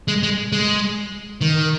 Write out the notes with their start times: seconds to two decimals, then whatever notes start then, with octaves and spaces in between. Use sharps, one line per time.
0.08 G#3
0.23 G#3
0.52 G#3
1.41 D#3